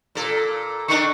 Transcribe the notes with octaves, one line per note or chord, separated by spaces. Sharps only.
A#2 A4
D#3 D4 C#6